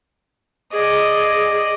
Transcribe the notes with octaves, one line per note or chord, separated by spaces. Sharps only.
G#4 D5 D#5